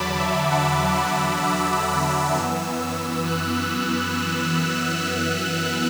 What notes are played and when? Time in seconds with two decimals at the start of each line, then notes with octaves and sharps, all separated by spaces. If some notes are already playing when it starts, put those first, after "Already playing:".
Already playing: E2 D3 F#3 A5 B5 D6
0.19 E5
0.50 F#5
0.97 F#5
1.43 E6
1.73 B5
2.05 D6
2.34 F#2 E3 B3 E6
2.80 E6
3.27 F#6
5.11 E6